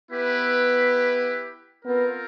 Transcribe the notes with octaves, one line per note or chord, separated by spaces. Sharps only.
B3 E4 G4 B4
B3 C4 F4 A#4